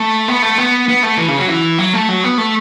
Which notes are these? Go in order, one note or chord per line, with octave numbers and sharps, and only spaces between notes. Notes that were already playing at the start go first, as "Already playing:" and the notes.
Already playing: A3
B3
A3
B3
B3
A3
E3
C#3
F#3
E3
F#3
A3
F#3
B3
A3